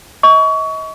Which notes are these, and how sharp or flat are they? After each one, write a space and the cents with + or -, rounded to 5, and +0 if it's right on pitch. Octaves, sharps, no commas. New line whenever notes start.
D#5 +35 C#6 +25